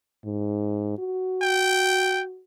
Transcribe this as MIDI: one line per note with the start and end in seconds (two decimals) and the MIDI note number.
0.25 0.96 44
0.98 2.42 66
1.42 2.22 79